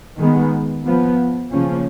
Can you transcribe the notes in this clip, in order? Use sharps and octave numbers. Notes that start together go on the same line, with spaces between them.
D#3 G#3 B3
F3 B3
C#3 F3 A#3 C#4